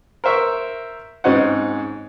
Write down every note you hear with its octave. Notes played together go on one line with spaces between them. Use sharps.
A#4 C5 E5 C#6
G#2 C4 C#4 D#4 F#5